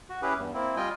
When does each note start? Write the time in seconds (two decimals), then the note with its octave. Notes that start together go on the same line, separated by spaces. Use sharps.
0.09 F#4
0.22 C#4 E4 G4 G#4 B4
0.36 E2 G2
0.54 A#3 C4 E4
0.76 G3 F4 D#5 G5 G#5